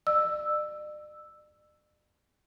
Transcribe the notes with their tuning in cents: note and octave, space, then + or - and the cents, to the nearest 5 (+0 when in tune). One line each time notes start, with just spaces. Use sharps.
D5 +40 E6 +0